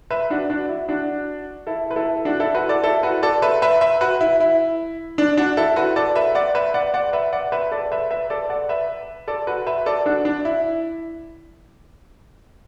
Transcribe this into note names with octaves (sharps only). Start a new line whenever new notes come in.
B4 E5
D4 F#4
D4 F#4
E4
D4 F#4
E4 A4
B4
E4 A4
D4 F#4
E4 A4
F#4 B4
A4 D5
E4 A4
F#4 B4
A4 D5
B4 E5
B4 E5
B4 E5
F#4 B4
E4
E4
D4
D4 F#4
E4 A4
F#4 B4
A4 D5
B4 E5
D5 F#5
B4 E5
D5 F#5
D5 F#5
B4 E5
D5 F#5
B4 E5
A4 D5
B4 E5
B4 E5
A4 D5
D5 F#5
B4 E5
A4 D5
F#4 B4
B4 E5
A4 D5
D4 F#4
D4
E4